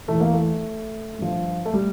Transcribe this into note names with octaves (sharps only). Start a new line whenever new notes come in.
E2 E3 A3
A#3
A3
G2 F3
A3
G3